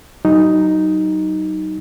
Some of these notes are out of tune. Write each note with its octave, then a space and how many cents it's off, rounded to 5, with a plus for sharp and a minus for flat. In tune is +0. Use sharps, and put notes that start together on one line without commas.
F#3 +35 D#4 +0